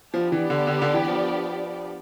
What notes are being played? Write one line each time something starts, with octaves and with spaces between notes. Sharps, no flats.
F3 B3 D4 G4 D5
E3
D3
D3
D3
E3
F3